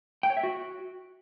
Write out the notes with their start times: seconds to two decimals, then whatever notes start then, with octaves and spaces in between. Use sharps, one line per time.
0.23 G5
0.30 C#5
0.37 E5
0.43 F#4